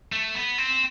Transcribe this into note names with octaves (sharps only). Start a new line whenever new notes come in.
A3
B3
C4